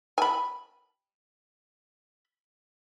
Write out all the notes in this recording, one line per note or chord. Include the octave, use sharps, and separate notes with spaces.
G#5 B5